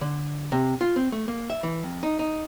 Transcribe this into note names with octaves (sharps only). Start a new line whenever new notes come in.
D3
C3
F4
C4
A3
A#3
E5
E3
F2
D#4
D#4